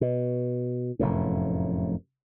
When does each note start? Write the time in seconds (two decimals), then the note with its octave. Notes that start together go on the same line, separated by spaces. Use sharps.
0.01 B2
0.99 F1 F#2 A2